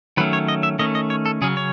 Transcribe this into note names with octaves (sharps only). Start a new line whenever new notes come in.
D#3 F#3 A3 C#4 B4
C#5
D#5
E5
D#3 A3 C#4 D#5
D#5
C#5
A4
C#3 F#3 C#4 G#4
C#5